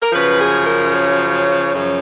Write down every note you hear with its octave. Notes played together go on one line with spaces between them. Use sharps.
A#4
F#2 C#3 F3 B4
G#4
A#4
C#5
F#2 C#3 F3